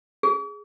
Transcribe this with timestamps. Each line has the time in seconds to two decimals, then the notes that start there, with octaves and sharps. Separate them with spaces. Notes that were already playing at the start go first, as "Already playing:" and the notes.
0.23 G#4